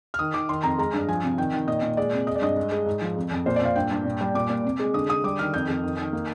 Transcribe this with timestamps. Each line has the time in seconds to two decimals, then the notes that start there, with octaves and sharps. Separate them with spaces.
0.14 F6
0.19 D#3 D#6
0.34 D#3 D6
0.49 D#3 C6
0.63 F2 A#5
0.78 G#3 A#5
0.93 G2
1.08 F3 G#5
1.23 C3
1.38 D#3 G5
1.54 D#3
1.67 A#2 D#5
1.82 A#2
1.97 G#3 D5
2.13 C3
2.27 G#3 D#5
2.35 D5
2.42 G2 D#5
2.56 G#3
2.72 G#3
2.86 G#2
3.02 F3
3.17 F2
3.32 F2
3.46 A#2 C5
3.56 D5
3.61 A#2 F5
3.76 G2 G5
3.91 G2
4.05 A#2
4.21 G3
4.35 A#2 D6
4.50 A#2
4.64 C3
4.80 G#3
4.94 D3 D#6
5.09 D3 D#6
5.24 G3 D6
5.39 D#3 F6
5.54 F2 G6
5.68 F2
5.84 D#3
5.99 D#3
6.13 A#3